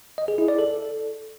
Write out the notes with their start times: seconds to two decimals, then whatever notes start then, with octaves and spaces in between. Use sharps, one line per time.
0.18 D#5
0.28 G#4
0.38 E4
0.48 D5
0.59 A4